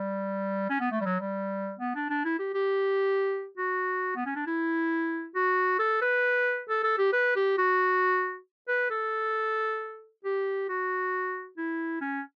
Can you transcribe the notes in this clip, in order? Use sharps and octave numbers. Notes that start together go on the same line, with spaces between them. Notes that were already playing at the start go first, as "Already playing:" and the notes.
Already playing: G3
C#4
B3
A3
G3
F#3
G3
B3
D4
D4
E4
G4
G4
F#4
B3
C#4
D4
E4
F#4
A4
B4
A4
A4
G4
B4
G4
F#4
B4
A4
G4
F#4
E4
C#4